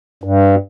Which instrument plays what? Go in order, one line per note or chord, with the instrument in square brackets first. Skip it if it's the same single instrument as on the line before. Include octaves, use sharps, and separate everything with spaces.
[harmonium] G2